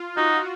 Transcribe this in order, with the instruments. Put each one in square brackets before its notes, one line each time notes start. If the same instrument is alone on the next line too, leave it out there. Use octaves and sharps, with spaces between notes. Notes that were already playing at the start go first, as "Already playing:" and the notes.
Already playing: [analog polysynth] F4
[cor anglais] D#4 [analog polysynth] F#4